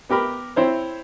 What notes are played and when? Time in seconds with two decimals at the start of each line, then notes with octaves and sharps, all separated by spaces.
0.09 B3 G4 A#4 B5
0.56 C4 E4 C5 C#5